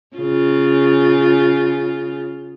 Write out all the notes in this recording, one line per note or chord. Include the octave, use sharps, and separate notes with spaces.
C#3 F4